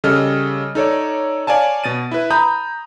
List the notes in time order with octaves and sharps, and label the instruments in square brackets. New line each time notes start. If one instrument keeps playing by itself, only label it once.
[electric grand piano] C#3 G3 A4 D#5 F6
D#4 A4 C#5 D5
C#5 D5 F5 G#5 A5
B2 A6 D#7
E4 B4
A#5 B5 D#6 G6